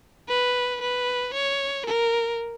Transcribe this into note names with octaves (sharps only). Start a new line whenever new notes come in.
B4
B4
C#5
A#4